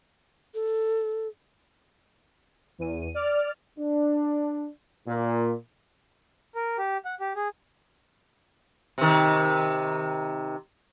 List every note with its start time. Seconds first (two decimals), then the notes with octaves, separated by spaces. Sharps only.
0.54 A4
2.78 E2 D#7
3.14 D5 F6
3.79 D4
5.08 A#2
6.55 A#4
6.78 G4
7.05 F#5
7.20 G4
7.36 G#4
8.98 C3 D#3